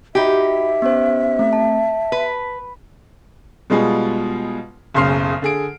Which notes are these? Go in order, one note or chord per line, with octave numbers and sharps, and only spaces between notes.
D#4 F#4 G4 E5 B5
B3 C#4 C5
A3 C4
A5
B4
B2 G3 G#3 F4 G#4
F#1 B1 C#3 C6 F6 C7
D3 G#4 D7